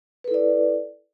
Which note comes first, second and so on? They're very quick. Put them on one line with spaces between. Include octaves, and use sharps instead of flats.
B4 A4 E4 D5